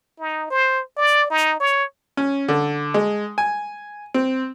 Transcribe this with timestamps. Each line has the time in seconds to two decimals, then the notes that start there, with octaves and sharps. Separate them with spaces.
0.19 D#4
0.50 C5
0.97 D5
1.30 D#4
1.60 C#5
2.17 C#4
2.48 D3
2.94 G#3
3.38 G#5
4.14 C4